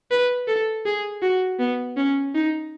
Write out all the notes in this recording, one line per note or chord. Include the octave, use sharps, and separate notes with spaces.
B4
A4
G#4
F#4
B3
C#4
D#4